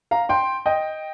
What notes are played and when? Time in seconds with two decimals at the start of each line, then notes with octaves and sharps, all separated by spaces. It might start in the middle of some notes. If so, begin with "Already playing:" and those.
0.11 F5 A#5
0.29 G5 C6
0.66 D#5 G5